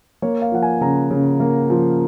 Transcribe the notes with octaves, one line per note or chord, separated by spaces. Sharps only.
A#3 C#5
F5
F3 F#5
G#5
C#3 A#5
C#3
A#3
F3